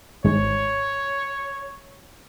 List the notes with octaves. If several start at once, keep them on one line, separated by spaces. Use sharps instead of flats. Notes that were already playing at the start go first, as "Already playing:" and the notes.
G#1 G#2 C#5